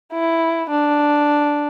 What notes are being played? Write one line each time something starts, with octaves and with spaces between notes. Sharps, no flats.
E4
D4